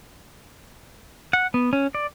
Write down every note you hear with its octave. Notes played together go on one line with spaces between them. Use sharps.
F#5
B3
C#4
D5